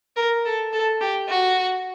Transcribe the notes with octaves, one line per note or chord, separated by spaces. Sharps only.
A#4
A4
A4
G4
F#4